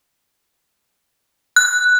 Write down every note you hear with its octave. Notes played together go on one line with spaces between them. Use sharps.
F#6